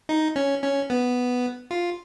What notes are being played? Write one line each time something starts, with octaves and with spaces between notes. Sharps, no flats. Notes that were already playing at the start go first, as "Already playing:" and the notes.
D#4
C#4
C#4
B3
F4